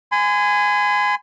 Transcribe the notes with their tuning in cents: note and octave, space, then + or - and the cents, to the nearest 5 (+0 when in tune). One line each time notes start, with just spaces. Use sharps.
G#5 +0 C6 -45